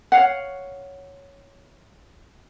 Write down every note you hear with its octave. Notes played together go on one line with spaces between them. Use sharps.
C#5 F5 F#5